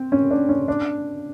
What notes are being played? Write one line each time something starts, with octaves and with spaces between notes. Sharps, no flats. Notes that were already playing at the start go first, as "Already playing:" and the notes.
Already playing: C4
C#4
D4
C#4
D4